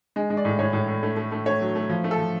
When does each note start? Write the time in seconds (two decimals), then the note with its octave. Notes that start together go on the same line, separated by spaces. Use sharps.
0.16 G#3
0.30 G#3
0.37 D5
0.45 A2
0.59 A2 C#5
0.73 A2
0.88 A2
1.03 A3
1.17 A3
1.32 A3
1.46 A3 C#5
1.61 F#3
1.76 A3
1.90 F3
2.04 A3
2.11 A4
2.19 F3